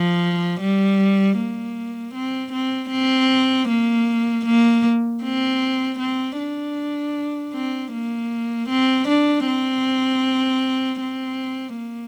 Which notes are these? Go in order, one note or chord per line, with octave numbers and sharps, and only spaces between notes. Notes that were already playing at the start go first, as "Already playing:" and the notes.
Already playing: F3
G3
A#3
C4
C4
C4
A#3
A#3
C4
C4
D4
C4
A#3
C4
D4
C4
C4
A#3